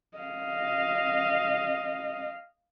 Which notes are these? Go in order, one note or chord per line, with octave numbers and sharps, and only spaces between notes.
D#5 F5